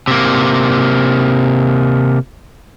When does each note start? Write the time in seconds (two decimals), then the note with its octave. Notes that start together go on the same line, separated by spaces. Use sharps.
0.08 C3 A#3